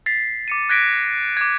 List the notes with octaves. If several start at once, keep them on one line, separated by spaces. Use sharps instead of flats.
A6 B6 C7
D6 C#7 D#7
F#6 G#6 A#6 B6 D7
D6 G#6